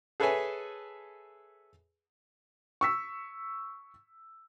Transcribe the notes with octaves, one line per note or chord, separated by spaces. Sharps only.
G#4 A4 B4 C#5 E5 G#5
C#6 E6 B6